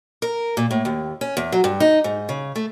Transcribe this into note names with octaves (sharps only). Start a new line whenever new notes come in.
A#4
A#2
A2
D#2
C#4
E2
F#3
G2
D#4
G#2
C#3
A3